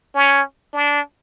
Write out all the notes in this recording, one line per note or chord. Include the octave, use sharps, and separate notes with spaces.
C#4
D4